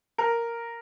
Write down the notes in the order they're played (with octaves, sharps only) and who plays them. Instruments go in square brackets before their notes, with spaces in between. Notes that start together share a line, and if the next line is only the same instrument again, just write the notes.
[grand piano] A#4